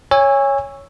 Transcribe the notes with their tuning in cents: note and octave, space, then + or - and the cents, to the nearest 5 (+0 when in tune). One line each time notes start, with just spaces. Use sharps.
C#5 +0 G#5 -25 E6 +5